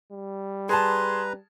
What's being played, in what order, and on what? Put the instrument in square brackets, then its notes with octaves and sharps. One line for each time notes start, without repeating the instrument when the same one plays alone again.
[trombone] G3
[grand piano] G#4 A5 [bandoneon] B4 A#5 [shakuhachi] C6